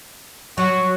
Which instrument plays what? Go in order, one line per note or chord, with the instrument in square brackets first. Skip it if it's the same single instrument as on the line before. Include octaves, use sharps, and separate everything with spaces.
[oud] F#3 [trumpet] F#4